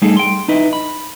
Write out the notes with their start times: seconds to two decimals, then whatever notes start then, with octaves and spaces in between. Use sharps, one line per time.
0.02 G3 A3 D#4 G#4 A4
0.17 G5 C6
0.48 D#4 E4 B4 D#5
0.73 B5